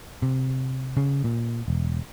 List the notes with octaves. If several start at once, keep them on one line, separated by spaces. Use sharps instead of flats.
C3
C#3
A#2
E1